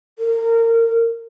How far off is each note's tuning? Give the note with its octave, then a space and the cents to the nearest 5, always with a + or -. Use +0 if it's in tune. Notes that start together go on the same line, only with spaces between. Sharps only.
A#4 -25